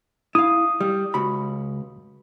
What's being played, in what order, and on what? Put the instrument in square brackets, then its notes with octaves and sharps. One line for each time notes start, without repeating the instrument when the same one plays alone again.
[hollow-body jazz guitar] E4 F5 [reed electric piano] D#6
[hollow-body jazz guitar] G3
C#2 F#4 B5